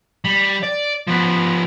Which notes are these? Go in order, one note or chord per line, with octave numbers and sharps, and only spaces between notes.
G3
D5
F3 B3